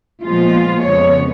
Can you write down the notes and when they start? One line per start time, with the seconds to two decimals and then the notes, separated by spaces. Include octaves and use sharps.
0.23 A#2 F3 G#3 B3 F4
0.82 F2 C#3 G#3 B3 C#5